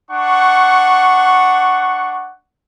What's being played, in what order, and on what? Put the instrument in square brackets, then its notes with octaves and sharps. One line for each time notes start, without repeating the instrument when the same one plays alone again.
[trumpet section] D4 F#5 C#6